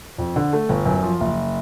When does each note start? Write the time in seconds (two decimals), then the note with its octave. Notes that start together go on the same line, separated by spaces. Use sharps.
0.18 F2
0.36 D3
0.53 A3
0.69 G1
0.85 F#2
1.03 F3
1.20 F#1